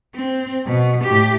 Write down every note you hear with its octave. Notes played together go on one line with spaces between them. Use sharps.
C4
B2
A2 G4